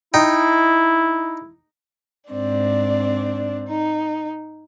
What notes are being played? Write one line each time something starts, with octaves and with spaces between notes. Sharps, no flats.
D#4 E4 G5
G#2 C4 D4 D5
D#4